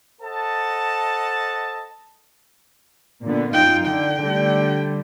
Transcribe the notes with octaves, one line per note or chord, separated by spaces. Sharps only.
A4 C5 D#5 F#5 A5
A#2 D3 B3
F#2 D#4 F4 G5
D3 G5
D3 G3 A3